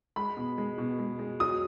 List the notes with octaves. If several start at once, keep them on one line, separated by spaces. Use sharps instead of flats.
G#3 B5
B2
G#3
B2
G#3
G#3
F#3 D#6